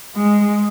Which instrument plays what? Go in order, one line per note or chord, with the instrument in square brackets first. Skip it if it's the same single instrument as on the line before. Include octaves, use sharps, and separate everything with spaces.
[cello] G#3